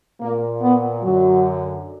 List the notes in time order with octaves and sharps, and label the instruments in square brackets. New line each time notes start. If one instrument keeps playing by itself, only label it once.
[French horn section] A#2 A#3
B3
F#2 D3 F#3